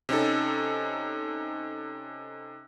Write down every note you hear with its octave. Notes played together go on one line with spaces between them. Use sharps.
C3 C#4 D#4 A4